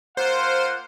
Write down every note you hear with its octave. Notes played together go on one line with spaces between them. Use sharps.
A#3 F4 C5 F#5